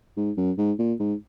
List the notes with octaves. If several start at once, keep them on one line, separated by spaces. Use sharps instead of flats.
G#2
F#2
G#2
A#2
G#2